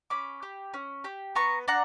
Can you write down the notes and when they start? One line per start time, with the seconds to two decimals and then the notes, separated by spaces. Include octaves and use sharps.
0.10 C#4 B5 D6
0.43 G4
0.74 C#4
1.04 G4
1.35 B3 A#5 C#6
1.68 D4 F#5 A#5